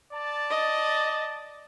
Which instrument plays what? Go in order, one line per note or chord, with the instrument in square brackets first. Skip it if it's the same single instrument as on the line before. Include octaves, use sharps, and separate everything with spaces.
[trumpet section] D5 A5
[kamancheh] D#5